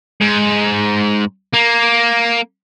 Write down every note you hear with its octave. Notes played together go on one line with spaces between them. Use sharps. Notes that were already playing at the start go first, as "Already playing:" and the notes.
G#2
A#3